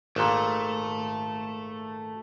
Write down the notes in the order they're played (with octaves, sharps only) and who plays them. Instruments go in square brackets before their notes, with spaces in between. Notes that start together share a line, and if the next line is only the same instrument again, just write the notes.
[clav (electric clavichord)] G#1 A#2 [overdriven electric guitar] A3